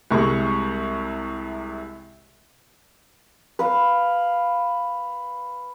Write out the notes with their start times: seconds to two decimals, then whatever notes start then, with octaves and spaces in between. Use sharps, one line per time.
0.11 C2 C3 G#3 C#6
3.59 B4 F5